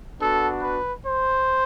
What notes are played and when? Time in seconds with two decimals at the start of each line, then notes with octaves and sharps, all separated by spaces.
0.20 B3 D4 F#4 A4
0.62 B4
1.06 C5